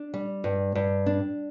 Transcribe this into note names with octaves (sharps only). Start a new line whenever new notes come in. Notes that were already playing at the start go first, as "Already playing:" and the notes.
Already playing: D4
G3
G2
G2
D4